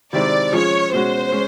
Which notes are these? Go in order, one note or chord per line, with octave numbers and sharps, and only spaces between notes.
C3 D#3 G#3 C4 E4 D5
F3 G#3 C#4 F4 G#4 C#5
B2 G#3 C#4 F#4 C5
G#3 C#4